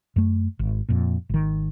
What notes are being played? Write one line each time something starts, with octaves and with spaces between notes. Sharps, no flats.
F#2 A3
G#1
F2 A#2
G#1 D#3